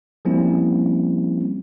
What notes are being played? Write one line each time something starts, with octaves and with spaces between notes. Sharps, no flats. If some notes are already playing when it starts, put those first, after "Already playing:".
F3 G3 A#3 C4 C#4 E4